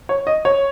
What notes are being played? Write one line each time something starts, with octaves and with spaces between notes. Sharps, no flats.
C#5
D#5
C#5